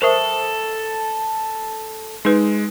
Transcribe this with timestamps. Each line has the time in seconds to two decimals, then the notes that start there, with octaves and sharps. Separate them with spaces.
0.02 A4 A#4 C5 E5 C#6 D#6
2.25 G#3 D#4 B4